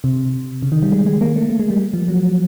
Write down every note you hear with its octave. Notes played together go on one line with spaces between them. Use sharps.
C3
C#3
D#3
G3
G#3
G#3
A#3
A3
A3
G#3
G3
F3
F#3